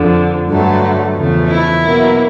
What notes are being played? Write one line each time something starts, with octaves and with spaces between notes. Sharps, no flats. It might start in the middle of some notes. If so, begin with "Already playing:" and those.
Already playing: F2 D3 F3
G2 D3 F#3 A3
E2 C#3 F3 A3
E4
B2 F#3 A#3